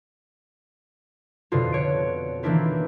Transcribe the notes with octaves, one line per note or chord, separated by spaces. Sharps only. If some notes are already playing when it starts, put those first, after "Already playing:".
F2 B2 D3 F4
C#5 D7
D#3 E3 A#3 D4 E4 F4